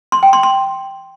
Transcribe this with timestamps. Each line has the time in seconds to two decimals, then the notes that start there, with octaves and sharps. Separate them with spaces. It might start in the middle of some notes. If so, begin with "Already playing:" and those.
0.12 C6
0.23 G5
0.33 C6
0.43 C6